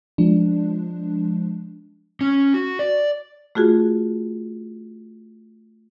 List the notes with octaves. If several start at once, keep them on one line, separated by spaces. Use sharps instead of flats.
F3 G#3 D4
C#4
F#4
D5
A3 F4 F#4 G#4